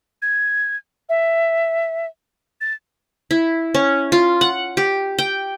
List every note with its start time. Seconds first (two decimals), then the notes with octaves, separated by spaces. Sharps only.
0.22 G#6
1.09 E5
2.61 A6
3.31 E4
3.74 C#4
4.12 F4
4.41 F#5
4.77 G4
5.19 G5